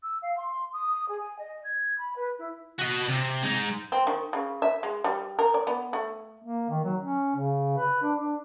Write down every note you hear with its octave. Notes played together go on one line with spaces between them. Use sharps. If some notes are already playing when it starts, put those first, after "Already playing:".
E6
F5
C6
D#6
G#4
G#5
D#5
G#6
B5
B4
E4
F#4 D#5
C3
G#3 D#4
C4
D#3
C#3
E5
G#3
G3
A#4
D5
B3
A3
A#3
D#3
F#3
C#4
C#3
B4
D4
D4